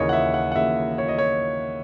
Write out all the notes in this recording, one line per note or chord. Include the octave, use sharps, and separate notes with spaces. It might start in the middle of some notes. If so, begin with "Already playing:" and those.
Already playing: D#2 C#3 E3 A#3 C#5 D#5
F#5
E5
F#5
F#5
D#2 C#3 E3 A#3 E5
C#5
D#5
C#5